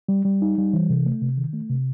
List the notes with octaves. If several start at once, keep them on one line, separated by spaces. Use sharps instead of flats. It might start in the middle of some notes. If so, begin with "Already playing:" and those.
G3
G3
D#4
G3
E3
C3
A3
C3
D#3
A3
C3